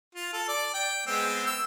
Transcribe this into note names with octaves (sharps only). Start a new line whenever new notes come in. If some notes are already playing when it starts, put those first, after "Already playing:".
F4
A4
D5
G5
G#3 B3 C4
E6